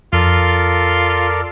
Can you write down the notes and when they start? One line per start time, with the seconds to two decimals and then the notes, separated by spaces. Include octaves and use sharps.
0.13 F2 F4 A4 A#4 D5